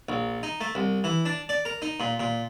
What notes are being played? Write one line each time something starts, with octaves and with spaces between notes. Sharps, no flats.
A#1
D#4
A3
C2
E3
D4
D5
A#4
D#4
A#2
A#2